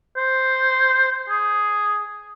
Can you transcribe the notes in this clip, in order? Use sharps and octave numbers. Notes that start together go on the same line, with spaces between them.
C5
G#4